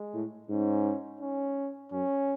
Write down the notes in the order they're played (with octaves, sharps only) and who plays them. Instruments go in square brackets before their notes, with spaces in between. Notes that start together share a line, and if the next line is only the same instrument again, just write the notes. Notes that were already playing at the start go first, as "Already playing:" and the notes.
Already playing: [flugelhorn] G#3
[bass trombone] A2
[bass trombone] G#2 [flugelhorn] C#4
[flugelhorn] C#4
[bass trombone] F#2 [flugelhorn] C#4